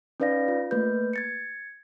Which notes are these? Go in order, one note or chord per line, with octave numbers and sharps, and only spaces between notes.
C#4 D#4 B4 D5 F5 A#6
F4
A3 A#3 B4 G6
G#6 A6 C#7